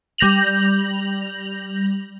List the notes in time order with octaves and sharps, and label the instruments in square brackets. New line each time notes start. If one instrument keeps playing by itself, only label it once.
[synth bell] G3 G6 A#6 F7 F#7